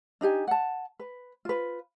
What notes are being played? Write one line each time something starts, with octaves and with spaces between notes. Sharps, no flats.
D4 D#4 G4 G#5
F#5 A5
B4
F4 B4